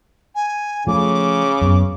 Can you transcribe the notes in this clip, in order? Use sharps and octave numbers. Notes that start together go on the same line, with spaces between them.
G#5
C#3 F3 A3 D6
F#2 B3